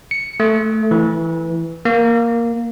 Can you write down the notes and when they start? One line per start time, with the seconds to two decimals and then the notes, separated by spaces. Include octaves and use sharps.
0.11 C#7
0.40 A3
0.91 E3
1.85 A#3